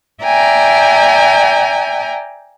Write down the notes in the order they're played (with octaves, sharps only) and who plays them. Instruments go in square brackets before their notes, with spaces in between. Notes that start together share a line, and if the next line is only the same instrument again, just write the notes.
[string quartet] D5 E5 G5 G#5 A#5